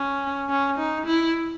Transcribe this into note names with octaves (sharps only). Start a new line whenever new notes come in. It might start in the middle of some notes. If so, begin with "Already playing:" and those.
Already playing: C#4
C#4
D#4
E4